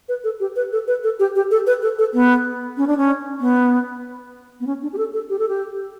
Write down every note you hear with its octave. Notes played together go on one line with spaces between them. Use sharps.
B4
A4
G4
B4
A4
B4
A4
G4
G4
A4
B4
A4
A4
B3
C#4
D4
C#4
B3
B3
C#4
D4
G4
A4
A4
G4
A4
G4